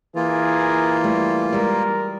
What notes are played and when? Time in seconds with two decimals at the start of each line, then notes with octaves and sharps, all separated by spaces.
0.16 E3 A#3 F4 G#4 A#4
1.04 G3 A3
1.52 G3 G#3 A#4